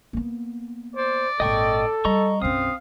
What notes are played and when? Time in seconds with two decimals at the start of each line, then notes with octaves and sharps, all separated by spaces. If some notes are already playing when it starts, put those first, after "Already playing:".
0.13 A#3 B3
0.96 C5 D5
1.40 G#1 A#2 A4 D#5 G5 C#6
2.05 G3 D#5 A#5 C#6
2.42 B1 F#2 C4 F5 D#6